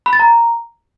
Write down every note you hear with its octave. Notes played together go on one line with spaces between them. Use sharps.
B5
A6
A#5